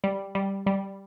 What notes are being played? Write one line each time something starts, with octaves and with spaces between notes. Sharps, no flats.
G3
G3
G3